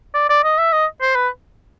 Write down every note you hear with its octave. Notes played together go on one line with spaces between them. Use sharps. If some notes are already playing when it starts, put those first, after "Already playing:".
D5
D5
D#5
E5
D#5
C5
B4